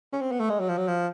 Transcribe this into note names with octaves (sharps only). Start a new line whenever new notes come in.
C#4
C4
B3
A3
G#3
F#3
F3
F#3
F3